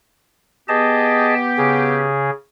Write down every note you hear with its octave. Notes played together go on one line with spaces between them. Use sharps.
B3 G4 G#4 D#5 A5
C#3 G#4